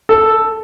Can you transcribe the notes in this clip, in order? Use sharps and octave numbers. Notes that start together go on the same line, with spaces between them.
A4